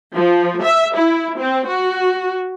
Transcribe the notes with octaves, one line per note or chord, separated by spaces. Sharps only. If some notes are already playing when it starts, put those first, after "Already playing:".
F3
E5
E4
C4
F#4